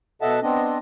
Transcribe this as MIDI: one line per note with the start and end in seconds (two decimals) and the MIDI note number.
0.22 0.40 47
0.22 0.40 69
0.22 0.40 75
0.22 0.40 76
0.22 0.40 78
0.22 0.40 81
0.42 0.78 59
0.42 0.78 60
0.42 0.78 62
0.42 0.78 75